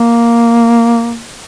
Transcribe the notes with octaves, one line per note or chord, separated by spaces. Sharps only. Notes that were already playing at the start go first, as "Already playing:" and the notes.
Already playing: A#3